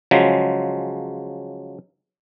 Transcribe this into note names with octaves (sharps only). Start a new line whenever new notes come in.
C#3 F3 F#3 G#3